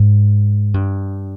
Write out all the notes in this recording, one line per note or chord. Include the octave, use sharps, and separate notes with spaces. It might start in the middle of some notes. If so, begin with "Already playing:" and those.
Already playing: G#2
G2